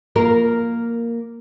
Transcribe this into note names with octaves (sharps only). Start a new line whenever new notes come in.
A#3 F4 A#4